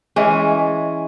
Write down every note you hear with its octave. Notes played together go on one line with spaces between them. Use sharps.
E3 G#3 C#4